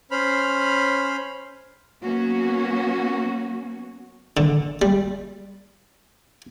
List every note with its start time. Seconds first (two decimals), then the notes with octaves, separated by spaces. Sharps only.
0.11 C#4 C5 B5 F6
2.02 F#3 A#3 B3 C#4 F#4
4.37 D3
4.82 G3